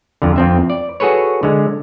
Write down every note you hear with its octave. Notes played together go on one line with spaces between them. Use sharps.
F2 D3
F2 C4 E5
D5
F#4 G#4 A4 B4 C#5
D3 G#3